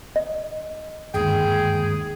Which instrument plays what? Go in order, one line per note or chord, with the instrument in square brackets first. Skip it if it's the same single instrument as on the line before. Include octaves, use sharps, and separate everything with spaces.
[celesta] D#5
[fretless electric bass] G1 D#2 G#2 [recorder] G#4 [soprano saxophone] G5